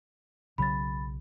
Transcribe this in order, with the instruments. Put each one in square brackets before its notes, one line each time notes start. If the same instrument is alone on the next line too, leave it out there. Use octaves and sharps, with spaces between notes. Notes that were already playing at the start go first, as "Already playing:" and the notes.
[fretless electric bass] B1 C#3 F#3 [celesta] B5 A6